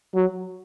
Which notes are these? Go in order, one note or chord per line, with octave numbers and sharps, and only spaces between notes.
F#3